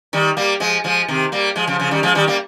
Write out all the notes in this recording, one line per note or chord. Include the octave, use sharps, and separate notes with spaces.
D#3 G3
G3 A#3
F3 G#3
F3 G#3
C3 D#3
G3 A#3
F3 G#3
C#3 F3
C#3 F3
D#3 G3
F3 G#3
D#3 G3
G3 A#3